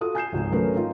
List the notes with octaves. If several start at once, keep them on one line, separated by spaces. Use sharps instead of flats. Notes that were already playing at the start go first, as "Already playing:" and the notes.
F4 F#4 A4 D#6
G#5 G6 C7 E7
G#1 C#2 F3
F#3 A3 C#4 A#4 B4
D#3 D#4 F4